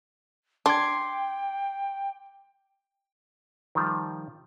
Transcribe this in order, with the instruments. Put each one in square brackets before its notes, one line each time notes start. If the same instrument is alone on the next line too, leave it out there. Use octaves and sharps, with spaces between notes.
[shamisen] D4 [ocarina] G5 [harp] C6 D6 G#6
[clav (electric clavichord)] D#3 F3 G3